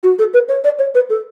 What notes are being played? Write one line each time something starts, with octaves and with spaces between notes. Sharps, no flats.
F#4
A4
B4
C#5
D5
C#5
B4
A4